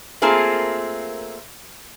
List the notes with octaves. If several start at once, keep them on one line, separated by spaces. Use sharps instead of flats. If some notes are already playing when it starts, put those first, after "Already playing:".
A3 A#3 C4 F4 G#4 A#4